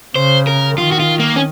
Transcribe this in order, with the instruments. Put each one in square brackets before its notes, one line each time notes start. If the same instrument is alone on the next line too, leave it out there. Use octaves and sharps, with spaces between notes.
[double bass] C#3 [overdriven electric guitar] C5
[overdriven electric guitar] A#4
[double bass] D#3 [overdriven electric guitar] F4
[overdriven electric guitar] F#4
F4
A#3
C#4